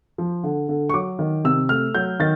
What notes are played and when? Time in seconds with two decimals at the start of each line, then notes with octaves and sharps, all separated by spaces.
0.18 F3
0.44 D3
0.69 D3
0.89 C#6
0.94 F#3 D6
1.19 D#3
1.44 C3 E6
1.69 A3 F6
1.95 F#3 G6
2.20 D#3 A6